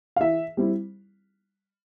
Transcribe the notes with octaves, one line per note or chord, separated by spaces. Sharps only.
F5
E3 E5
G3 C4 E4